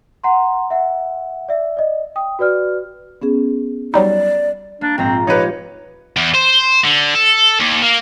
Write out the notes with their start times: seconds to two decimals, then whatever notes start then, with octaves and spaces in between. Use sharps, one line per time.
0.24 F#5 A#5 C6
0.70 E5 F#5
1.49 D5 E5
1.77 D5 D#5
2.16 G5 D#6
2.39 F#4 B4 D5 F6
3.22 B3 C#4 G#4
3.94 F#3 G3 D#4 D5
4.81 A#3 D4
4.98 A#1 G#2 C4 A#5
5.27 F3 D#4 G4 B4 C#5
6.17 E2
6.34 C5
6.84 D3
7.15 A4
7.60 D#2
7.82 A#3